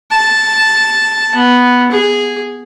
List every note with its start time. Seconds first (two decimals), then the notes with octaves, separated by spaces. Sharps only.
0.11 A5
1.35 B3
1.91 G#4